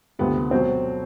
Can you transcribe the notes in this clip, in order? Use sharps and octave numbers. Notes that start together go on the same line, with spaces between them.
D2 C3 F3 B3
B2 F#3 C4